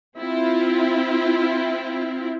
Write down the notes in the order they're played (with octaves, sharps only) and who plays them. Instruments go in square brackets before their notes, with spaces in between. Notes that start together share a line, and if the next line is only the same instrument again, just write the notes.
[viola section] C4 E4 F4